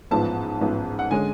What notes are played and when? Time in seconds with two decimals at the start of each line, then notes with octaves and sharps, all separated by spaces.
0.11 A1 G#2 F3 B3 A5
0.61 A1 G#2 F3 B3
0.99 F#5
1.11 D3 G#3 C#4 G#5